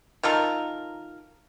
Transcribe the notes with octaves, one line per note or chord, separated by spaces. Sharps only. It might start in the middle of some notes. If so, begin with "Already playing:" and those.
D#3 F4 A4 A#4